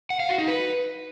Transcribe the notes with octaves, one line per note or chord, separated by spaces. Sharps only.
F#5
F5
F#4
D#4
B4